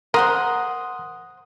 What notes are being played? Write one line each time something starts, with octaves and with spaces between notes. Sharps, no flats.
A#4 C5 F#5 C6 D#6